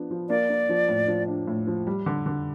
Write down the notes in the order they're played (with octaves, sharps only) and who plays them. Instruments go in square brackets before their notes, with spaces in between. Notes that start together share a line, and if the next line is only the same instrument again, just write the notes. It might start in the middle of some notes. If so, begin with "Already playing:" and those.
Already playing: [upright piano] F3 B3 D4
F3
[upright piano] A#3 [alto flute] D5
[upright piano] A#3
F3
A2
F3
D4
A2
F3
G3
D3
D3